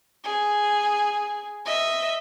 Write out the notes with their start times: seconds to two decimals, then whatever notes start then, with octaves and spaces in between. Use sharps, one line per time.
0.24 G#4
1.66 D#5 E5